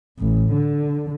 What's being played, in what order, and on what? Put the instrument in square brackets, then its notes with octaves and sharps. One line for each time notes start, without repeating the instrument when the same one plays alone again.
[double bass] A1
D3